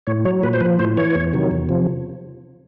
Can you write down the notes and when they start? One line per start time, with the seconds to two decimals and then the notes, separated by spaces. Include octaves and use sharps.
0.07 A2 C#5
0.25 F#3 C#5
0.43 A#2 B4
0.53 C5
0.60 F3 B4
0.79 A2 C5
0.97 E3 C#5
1.15 E2
1.33 C3 D#3 F#3
1.51 E2
1.69 C3 F3